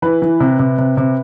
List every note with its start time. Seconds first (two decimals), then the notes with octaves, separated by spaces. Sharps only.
0.02 E3 B4
0.22 E3
0.40 C3
0.59 C3
0.78 C3
0.97 C3